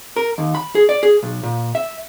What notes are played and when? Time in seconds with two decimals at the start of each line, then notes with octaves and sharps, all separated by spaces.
0.16 A#4
0.38 D#2
0.55 B5
0.75 G#4
0.89 D5
1.03 G#4
1.23 B1
1.43 A#2
1.75 E5